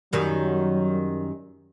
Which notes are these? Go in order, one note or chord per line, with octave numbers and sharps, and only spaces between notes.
F#2 D#3 F#3 G3